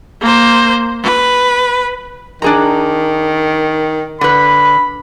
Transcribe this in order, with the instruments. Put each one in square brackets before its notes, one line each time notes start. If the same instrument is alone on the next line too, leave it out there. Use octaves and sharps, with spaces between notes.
[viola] A#3 C5
B4
[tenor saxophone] D#3 [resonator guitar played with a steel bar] D4 G#4 A#5
[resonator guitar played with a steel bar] D3 B4 [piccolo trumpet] B5